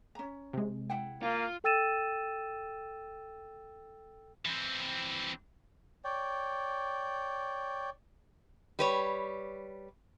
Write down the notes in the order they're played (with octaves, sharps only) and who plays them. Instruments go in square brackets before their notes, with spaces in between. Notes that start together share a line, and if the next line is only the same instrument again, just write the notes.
[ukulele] C#4 A#5
[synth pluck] C3 G#3
[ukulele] E4 F#5 G5
[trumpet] A#3 [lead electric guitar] F4
[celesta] A4 G5 E6 A6 D#7 E7
[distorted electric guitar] E3 C4
[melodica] C#5 D5 G5
[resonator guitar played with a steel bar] G3 B4 C#5